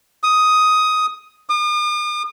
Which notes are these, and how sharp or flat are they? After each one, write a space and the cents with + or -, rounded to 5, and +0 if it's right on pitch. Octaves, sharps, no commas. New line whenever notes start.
D#6 +10
D#6 -45